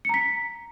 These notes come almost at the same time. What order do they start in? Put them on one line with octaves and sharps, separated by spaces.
C#7 A#5 B6